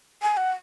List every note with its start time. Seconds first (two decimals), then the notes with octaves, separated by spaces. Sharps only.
0.22 G#5
0.37 F#5